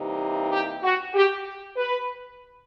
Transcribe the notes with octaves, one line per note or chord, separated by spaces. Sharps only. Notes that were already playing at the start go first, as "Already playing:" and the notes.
Already playing: C3 E3 G3 A#3 D#4
G4
F#4
G4
B4